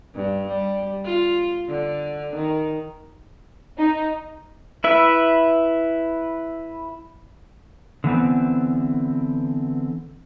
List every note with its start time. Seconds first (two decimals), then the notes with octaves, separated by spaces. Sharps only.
0.15 G2
0.48 G3
1.05 F4
1.68 D3
2.35 D#3
3.77 D#4
4.84 E4 B4 E5
8.04 D3 E3 B3 C4